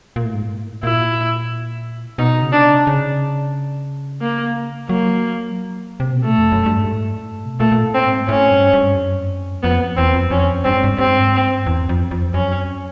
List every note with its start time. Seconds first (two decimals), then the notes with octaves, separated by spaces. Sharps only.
0.16 A#2
0.25 A2
0.34 G#2
0.43 A2
0.83 A#2 E4
2.18 B2 D#4
2.42 C#3
2.52 C3 D4
2.87 C#3
4.22 A#3
4.89 F#3 A#3
6.00 C3
6.13 B2
6.24 A#2 A3
6.38 F2
6.52 F#2
6.66 G2
6.79 G#2
6.93 A2
7.45 C3
7.53 B2
7.60 A#2 A3
7.72 A#2
7.83 A2
7.94 C4
8.05 G#2
8.28 A2 C#4
8.51 G2
8.73 G2
8.96 F#2
9.63 F2 B3
9.97 E2 C4
10.14 F2
10.31 F2 C#4
10.64 G2 C4
10.74 G#2
10.84 G2
10.98 G2 C4
11.07 G#2
11.16 G2
11.24 G#2
11.32 G2
11.41 G#2
11.49 G2
11.66 E2
11.89 F2
12.11 F2
12.34 F#2 C#4